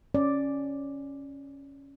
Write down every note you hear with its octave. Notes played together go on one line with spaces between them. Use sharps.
C#4 D5